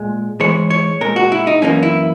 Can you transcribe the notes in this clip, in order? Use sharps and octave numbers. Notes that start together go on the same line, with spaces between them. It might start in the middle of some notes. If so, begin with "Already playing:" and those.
Already playing: A#2 G#3
G#2 E3 G#3 C#5
C#5
A#2 G#3 A#4
F#4
E4
D#4
F#2 E3 A#3 C#4
E4